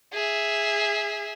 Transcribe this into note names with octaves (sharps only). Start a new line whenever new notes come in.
G#4 E5